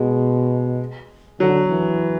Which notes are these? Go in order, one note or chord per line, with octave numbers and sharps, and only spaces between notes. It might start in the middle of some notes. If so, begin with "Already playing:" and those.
Already playing: B2 G#3
D3 F#3
E3